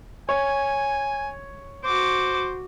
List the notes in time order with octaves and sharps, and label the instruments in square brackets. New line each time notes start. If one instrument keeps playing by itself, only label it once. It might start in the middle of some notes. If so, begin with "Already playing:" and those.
[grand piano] C#5 [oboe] G#5
[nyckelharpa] F#4 D6 [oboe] C5